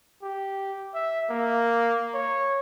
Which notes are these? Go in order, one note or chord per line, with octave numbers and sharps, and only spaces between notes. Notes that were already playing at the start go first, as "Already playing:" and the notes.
G4
E5
A#3
C#5